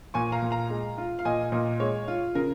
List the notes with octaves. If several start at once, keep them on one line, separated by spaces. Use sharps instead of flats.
A#2 G#5 C#6
F5 A#5
A#2
F5 A#5
G#3
F4
F5
A#2 D#5 G#5
A#2 A#4 D#5
G#3 C#5
F4
C#3 A#4